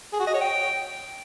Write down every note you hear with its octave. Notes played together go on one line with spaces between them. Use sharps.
G#4
F#4
D#5
C#5
G5